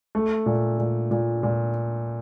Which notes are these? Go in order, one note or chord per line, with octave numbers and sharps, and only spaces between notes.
A3
A#2
A#2
A#2
A#2